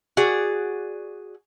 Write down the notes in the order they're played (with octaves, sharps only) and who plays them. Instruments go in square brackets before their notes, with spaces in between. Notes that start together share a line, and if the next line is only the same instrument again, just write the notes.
[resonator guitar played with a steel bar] F#4 G#4 D5